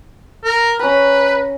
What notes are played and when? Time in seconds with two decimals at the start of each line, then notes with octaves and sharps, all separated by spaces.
0.44 A#4
0.79 C#4 B4 A#5